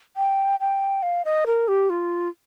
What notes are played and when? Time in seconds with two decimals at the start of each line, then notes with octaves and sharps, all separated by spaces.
0.17 G5
0.60 G5
1.03 F5
1.25 D#5
1.47 A#4
1.68 G4
1.90 F4